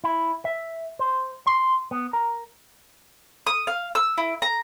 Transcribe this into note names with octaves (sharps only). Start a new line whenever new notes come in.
E4
E5
C5
C6
B3
A#4
D#6
F5
E6
E4
A#5